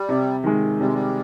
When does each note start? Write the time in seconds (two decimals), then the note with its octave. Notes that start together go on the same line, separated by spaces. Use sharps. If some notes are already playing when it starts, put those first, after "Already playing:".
Already playing: G3
0.09 C3
0.44 D#3 G#3
0.80 C3 G3
0.87 G#3
0.94 G3